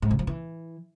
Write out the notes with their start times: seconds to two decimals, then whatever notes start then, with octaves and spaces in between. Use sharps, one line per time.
0.02 G#2
0.11 C3
0.19 F3
0.27 E3